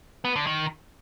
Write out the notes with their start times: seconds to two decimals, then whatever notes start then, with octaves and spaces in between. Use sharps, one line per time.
0.25 B3
0.36 D3
0.47 D#3